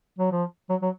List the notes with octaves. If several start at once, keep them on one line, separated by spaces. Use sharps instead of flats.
F#3
F3
F#3
F#3